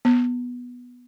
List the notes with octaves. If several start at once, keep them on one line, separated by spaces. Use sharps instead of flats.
B3